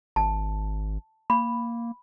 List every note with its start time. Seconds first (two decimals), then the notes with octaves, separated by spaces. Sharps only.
0.16 G#1 A5
1.30 A#3 B5